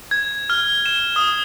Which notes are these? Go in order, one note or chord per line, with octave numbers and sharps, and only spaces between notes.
G#6
F6
E7
D#6